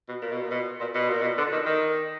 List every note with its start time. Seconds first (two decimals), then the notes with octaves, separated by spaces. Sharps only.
0.09 B2
0.22 A#2
0.32 B2
0.41 A#2
0.51 B2
0.81 A#2
0.95 B2
1.08 A#2
1.22 B2
1.38 D3
1.52 D#3
1.66 D#3